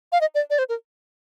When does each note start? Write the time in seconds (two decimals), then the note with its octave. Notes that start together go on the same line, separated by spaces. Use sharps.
0.12 F5
0.21 D#5
0.35 D5
0.50 D5
0.59 C5
0.69 A#4